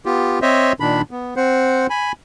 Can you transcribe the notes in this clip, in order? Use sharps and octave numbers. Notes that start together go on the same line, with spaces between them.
B3 F4 G4
C4 C5 C#5 D#5 E5
A#2 D#3 D4 B5
B3
C4 C5 F#5
G#5 B5